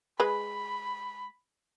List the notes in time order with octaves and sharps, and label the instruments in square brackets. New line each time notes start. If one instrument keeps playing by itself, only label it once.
[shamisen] G#3 B4 [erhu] B5